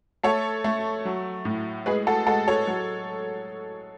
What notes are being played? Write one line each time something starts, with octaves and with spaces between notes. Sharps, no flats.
A3 A4 C#5
A3
F#3
A2
G#3 G#4 B4
F#4 A4
G#3 F#4 A4
A4 C#5
F#3